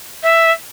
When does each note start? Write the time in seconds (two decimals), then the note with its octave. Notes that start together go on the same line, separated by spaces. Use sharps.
0.23 E5